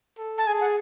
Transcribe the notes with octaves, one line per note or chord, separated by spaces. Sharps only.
A4
A5
G#4 G#5
F#5